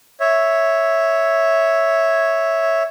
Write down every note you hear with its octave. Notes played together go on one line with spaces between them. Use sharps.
C#5 E5